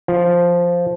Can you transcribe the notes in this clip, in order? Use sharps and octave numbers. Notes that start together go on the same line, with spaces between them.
F3